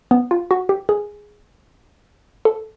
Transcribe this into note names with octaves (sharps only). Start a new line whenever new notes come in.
B3
F4
F#4
G4
G#4
A4